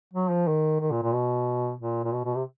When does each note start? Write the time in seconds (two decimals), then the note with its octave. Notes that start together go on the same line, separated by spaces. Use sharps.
0.13 F#3
0.30 F3
0.47 D#3
0.81 D#3
0.91 A#2
1.02 A#2
1.13 B2
1.80 A#2
2.04 A#2
2.13 B2
2.25 B2
2.36 C3